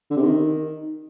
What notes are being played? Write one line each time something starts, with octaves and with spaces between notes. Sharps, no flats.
D3
C3
D#3